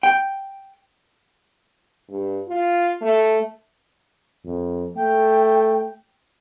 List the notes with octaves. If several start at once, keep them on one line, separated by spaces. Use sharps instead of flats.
G5
G2
F4
A3
F2
A3 G5